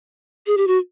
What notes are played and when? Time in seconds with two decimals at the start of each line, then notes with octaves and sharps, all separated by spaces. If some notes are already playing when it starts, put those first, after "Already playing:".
0.47 G#4
0.57 G4
0.67 F#4